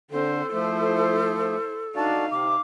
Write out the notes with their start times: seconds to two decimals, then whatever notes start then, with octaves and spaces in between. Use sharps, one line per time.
0.11 D3 C4 A4 C5
0.53 F3 A3 E4 C5
1.96 D4 D#4 F#4 D5 F5 A5
2.31 C3 D6